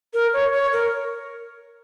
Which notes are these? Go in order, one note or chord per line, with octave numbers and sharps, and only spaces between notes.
A#4
C#5
C#5
A#4